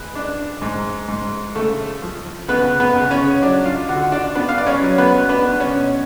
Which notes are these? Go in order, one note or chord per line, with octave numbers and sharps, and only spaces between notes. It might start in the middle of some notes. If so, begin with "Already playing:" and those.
Already playing: G#3 B4
D4
G#2
G#2
C#3 A3 A4
F3
C#3 B3 B4
B3 B4
C#3
C#4 C#5
F#3 D4 D5
F4 F5
D3 F#4 F#5
D4 D5
B3 D4 B4
F5
D5
C#4 C#5
F#3
B3 B4
B3 D4 B4
C#4 C#5
B2